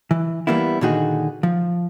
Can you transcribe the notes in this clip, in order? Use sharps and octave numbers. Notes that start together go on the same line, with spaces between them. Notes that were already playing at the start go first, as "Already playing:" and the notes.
E3
E3 G3 A#3 B3 E4
A#2 D3 D#3 D#4 F#4 G#4
F3